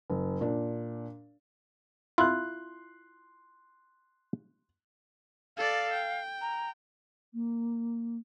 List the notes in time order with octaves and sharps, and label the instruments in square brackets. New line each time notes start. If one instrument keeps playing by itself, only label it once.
[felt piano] F#1
A#2 D4
[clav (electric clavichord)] E4 F4 [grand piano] C6 F#6
[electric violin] A4 D5 [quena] F5
[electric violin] G5
[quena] A#5
[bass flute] A#3